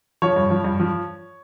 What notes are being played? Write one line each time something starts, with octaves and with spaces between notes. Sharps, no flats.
F3 C#5
G2
F3
G2
F3